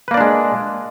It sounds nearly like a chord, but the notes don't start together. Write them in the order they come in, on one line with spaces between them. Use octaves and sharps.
B4 A#3 D5 D4 G#3